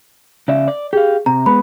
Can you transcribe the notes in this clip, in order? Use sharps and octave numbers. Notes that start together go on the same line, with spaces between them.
C#3 D5 E5
D5
G4 G#4 F5
C3 A#5
G#3 B3 B5